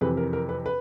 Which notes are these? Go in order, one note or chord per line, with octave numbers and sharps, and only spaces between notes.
F2 C3 E3 B4
A#4
A#4
B4
B4